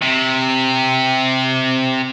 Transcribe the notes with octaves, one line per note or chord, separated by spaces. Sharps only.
C3